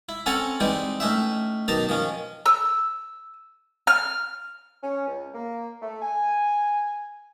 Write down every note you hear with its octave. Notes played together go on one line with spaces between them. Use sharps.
E4
C4 C#4 A4 F#5 G#5 A#5
E3 G3 G#3 C4 D#4
A2 C#4 D#4 E5
B1 D#3 D#4 A5 A#5
D#3 F3 C#4
E6
F6
C#4
C#2
A#3
A3
G#5